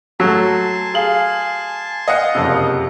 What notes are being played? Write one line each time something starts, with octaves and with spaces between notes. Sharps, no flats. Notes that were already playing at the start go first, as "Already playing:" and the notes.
F#3 A3 G#5 A5 C6
G#4 F5 F#7
D#5 F5 F#5
F#1 F2 C3